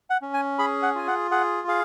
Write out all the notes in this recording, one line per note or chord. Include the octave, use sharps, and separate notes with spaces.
F#5
C#4
G#5
G#4 B5
F#5
F4 G#5
F#5
G#4 F#5
G#4 F5